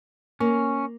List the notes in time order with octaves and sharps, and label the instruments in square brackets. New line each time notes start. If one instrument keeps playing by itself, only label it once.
[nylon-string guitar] A#3 [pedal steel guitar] C#4